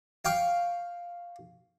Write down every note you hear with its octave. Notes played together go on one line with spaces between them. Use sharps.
F5 G5 C#6